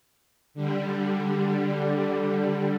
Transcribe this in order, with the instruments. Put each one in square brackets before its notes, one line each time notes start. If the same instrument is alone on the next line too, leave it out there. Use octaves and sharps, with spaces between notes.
[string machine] D3 G3